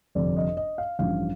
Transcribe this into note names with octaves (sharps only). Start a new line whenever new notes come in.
G1 F2 C3 D5
D#5
D#5
F5
A1 G2 F3 F5